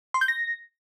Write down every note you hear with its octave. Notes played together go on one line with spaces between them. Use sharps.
C6
G6
A#6